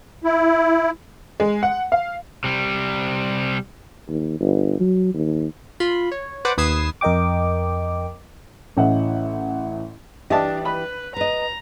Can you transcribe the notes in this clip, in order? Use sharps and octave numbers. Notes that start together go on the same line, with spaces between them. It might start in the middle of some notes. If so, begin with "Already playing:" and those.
E4
G#3
F#5
F5
C3 G3
D#2
G1
F#3
D#2
F4 B5 C6
C#5
B4 C5 D5 F#5 D6
D#2 B4 D#6 G#6 C7 E7
F2 A#4 D#5 G5 D6
A1 A2 C#4 D#5 E5 F#5
E3 D4 G4 D#5 E5 A5
B4 B5
B4 D#5 A#5